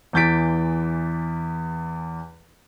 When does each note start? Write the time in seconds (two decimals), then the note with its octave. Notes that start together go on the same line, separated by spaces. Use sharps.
0.13 E2 E3 G6 A6 B6 D7